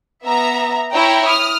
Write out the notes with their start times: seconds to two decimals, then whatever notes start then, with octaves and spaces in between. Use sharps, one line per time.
0.24 B3 E5 A#5
0.93 E4 C#5 G5 A#5
1.27 D#6 F6